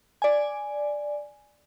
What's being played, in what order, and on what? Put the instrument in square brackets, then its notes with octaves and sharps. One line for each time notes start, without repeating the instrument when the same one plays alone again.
[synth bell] D5 G#5